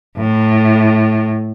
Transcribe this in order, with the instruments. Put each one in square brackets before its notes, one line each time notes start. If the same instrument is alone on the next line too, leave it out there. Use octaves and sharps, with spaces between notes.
[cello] A2